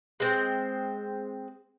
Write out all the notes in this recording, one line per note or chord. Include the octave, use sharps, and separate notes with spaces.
G#3 C4 C5